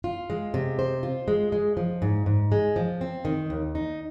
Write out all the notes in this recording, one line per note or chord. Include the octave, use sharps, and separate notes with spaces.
F4
G#3
C3
C5
F4
G#3
G#3
F3
G#2
G#2
G#3
F3
C4
D#3
D#2
D#4